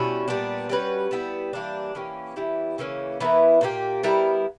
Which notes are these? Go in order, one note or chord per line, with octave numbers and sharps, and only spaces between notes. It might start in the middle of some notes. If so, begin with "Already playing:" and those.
Already playing: B2 G3 C#4 E4
A#2 G3 B3 D4
G3 C#4 F#4 B4
G3 B3 E4
E3 G3 A#3 D4
E3 A#3 C#4 G4
E3 G3 B3 E4
C#3 E3 A#3 C#4
E3 B3 E4 A#4
A#2 A#3 D4 G4
G3 B3 E4 A#4